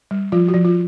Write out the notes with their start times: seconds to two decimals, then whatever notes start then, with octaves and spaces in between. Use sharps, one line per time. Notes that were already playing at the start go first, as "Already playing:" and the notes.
0.11 G3
0.32 F3 F4
0.48 F#4
0.54 F3
0.65 F4